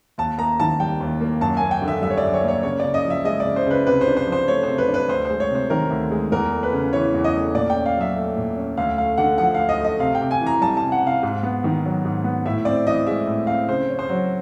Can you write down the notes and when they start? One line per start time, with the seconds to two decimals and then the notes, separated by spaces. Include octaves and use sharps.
0.18 D#2 A5
0.38 A#3 A#5
0.60 D#3 A5
0.80 G3 G5
1.00 D#2
1.21 A#3
1.41 F#2 A5
1.57 A#3 G#5
1.71 G5
1.82 D3
1.88 E5
2.02 G3 E5
2.10 C#5
2.17 F#2 D5
2.34 C#5
2.43 A#3
2.48 C#5
2.63 C#3 C#5
2.80 C#3 D5
2.94 D#5
3.04 F3
3.10 E5
3.25 G#3 D#5
3.40 C#3 D5
3.56 C5
3.66 C#3 B4
3.87 C3 B4
4.01 C5
4.07 D4
4.17 C5
4.27 F3
4.32 C5
4.48 A3 C#5
4.63 C3 C5
4.78 B4
4.88 D4
4.94 B4
5.08 D2 C5
5.25 G#3 C5
5.40 C#5
5.50 C3 C5
5.70 D#3 A#4
5.91 D2
6.11 G#3
6.32 E2 A#4
6.52 A3
6.63 B4
6.73 C#3
6.93 E3 C#5
7.14 E2
7.24 D#5
7.34 A3
7.54 A#2 D5
7.70 G5
7.75 C#4
7.86 F5
7.96 F#3 E5
8.16 A3
8.36 A#2
8.57 C#4
8.77 D2 F5
8.98 A3 F5
9.18 D3 F#5
9.38 F3 F#5
9.54 F5
9.60 D2
9.69 D#5
9.80 A3 D#5
9.99 C3 F5
10.15 G5
10.21 C3
10.31 G#5
10.40 E3
10.46 A#5
10.61 G3 A5
10.77 A5
10.82 C3
10.92 F#5
11.02 C3 F5
11.23 G#2
11.43 B3
11.64 D#3
11.85 F#3
12.05 G#2
12.24 B3
12.45 A2 E5
12.65 C4 D5
12.87 E3 D#5
13.06 G#3 E5
13.27 A2
13.47 C4 F5
13.68 C#3 C5
13.89 C#4
13.99 C5
14.09 F#3